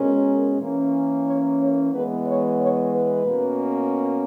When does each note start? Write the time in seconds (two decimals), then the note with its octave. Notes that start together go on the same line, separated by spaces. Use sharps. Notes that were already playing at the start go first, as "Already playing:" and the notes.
Already playing: B2 G#3 C#4 A#4
0.60 E3 A#3 C#4
1.26 C#5
1.60 C#5
1.92 E3 G#3 B3 B4
2.26 C#5
2.59 C#5
2.93 B4
3.26 B2 A#3 C#4